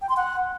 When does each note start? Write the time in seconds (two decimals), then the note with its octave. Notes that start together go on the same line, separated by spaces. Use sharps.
0.02 G5
0.09 C6
0.17 F#5